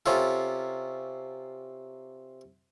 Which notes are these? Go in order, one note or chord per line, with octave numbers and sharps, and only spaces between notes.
C3 C#4 F4 A4